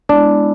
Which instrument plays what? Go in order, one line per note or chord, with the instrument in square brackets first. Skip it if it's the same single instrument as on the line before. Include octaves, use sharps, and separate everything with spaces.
[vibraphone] G#3 B3 E4 [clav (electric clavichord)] D4